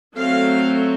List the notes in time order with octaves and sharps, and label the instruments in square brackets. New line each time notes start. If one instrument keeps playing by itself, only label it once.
[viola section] F#3 A3 C4 F5